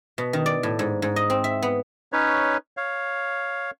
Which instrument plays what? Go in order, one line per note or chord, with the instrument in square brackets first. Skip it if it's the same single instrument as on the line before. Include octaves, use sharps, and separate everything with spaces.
[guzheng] B2
D#3
D5
A2
G#2
G#2
D#5
C4
E5
B3
[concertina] C#4 D#4 B4 C#5
C#5 F5